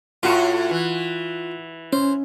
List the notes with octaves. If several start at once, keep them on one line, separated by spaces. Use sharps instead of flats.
A2 F4 F#4
E3
C#4 C5